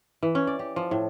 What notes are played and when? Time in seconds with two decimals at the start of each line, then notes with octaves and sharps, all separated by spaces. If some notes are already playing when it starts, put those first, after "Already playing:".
0.23 E3
0.35 C#4
0.47 D5
0.59 G4
0.76 F3
0.91 A2